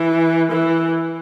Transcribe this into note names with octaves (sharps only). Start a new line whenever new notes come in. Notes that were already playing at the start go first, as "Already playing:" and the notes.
Already playing: E3
E3